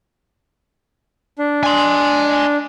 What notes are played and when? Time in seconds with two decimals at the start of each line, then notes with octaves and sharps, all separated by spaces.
1.38 D4
1.63 G#5 C6